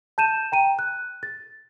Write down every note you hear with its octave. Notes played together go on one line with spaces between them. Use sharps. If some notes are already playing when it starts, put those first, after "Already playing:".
A5 G6 D#7 E7
G5 A#5 D#7
F#6
A6